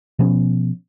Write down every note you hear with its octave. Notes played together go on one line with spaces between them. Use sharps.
B2 F3 B3 C#4